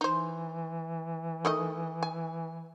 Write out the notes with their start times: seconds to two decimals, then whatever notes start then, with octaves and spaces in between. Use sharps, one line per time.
0.01 E3 D#4 C5
1.45 D#3 A3 D#5
2.03 G#5